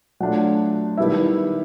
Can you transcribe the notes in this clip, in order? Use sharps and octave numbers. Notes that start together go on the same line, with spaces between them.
F#3 A3 D4 F4 F#5
D#3 G3 B3 E4 E5